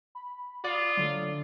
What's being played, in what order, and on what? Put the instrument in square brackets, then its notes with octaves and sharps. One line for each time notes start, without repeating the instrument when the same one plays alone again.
[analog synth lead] B5
[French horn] F4 [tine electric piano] D5 [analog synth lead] D#6
[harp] D3 A3 [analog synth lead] F#3